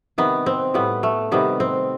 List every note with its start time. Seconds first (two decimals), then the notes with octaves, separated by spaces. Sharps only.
0.18 C3 D#3 G3 B3
0.46 C4
0.74 A2 G3 B3
1.03 A3
1.32 C3 D#3 G3 B3
1.60 C4